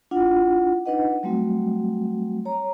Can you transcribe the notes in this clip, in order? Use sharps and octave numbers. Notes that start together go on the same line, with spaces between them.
D4 E4 F4 F#5
D4 D#4 B4 D#5 F#5
F#3 G3 A3 C4 F#4
C#5 A#5